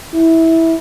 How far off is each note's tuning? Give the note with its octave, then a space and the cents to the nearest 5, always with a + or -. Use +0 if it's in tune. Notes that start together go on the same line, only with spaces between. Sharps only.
E4 -15